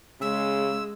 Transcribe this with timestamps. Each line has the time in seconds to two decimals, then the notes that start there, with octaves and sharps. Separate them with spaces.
0.21 C#3 G#3 E6